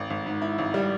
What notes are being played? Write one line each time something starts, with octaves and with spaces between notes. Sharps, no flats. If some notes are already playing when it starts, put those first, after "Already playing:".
Already playing: G#1
G#1
G#2
E4
G#1
G3